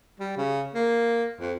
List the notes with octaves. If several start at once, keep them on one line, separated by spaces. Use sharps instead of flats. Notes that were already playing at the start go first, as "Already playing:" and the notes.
G3
C#3
A#3
F2